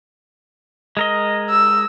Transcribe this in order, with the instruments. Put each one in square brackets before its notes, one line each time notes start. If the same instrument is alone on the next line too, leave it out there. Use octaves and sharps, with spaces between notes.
[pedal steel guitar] G#3 A#4 D#5
[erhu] E6